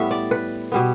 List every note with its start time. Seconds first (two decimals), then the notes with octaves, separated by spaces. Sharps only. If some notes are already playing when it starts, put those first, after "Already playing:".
Already playing: A2 G3 B3 E5
0.11 D5
0.31 B4
0.72 B2 G3 B3